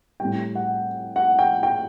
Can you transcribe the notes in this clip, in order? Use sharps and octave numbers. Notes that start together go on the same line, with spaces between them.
A2 G3 G5
F#5
F#5
G5
G5